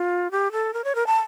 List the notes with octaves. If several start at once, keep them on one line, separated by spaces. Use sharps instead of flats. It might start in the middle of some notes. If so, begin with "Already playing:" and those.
Already playing: F4
G4
A4
A#4
C#5
A#4
A5